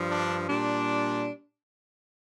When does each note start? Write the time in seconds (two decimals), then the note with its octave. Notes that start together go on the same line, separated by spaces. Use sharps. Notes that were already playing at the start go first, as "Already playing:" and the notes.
Already playing: G2 F3
0.09 D4
0.48 A#2 G3 D4